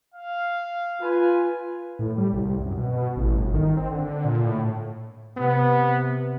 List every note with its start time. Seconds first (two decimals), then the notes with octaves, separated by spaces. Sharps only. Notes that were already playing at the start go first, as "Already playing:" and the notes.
0.14 F5
1.02 F4 B4 G#5
1.99 A2
2.18 G3
2.33 C2
2.61 F#2
2.77 B2
3.16 A1
3.35 G1
3.54 D#3
3.77 C4
3.91 D3
4.24 A#2
4.45 A2
5.37 C3 B3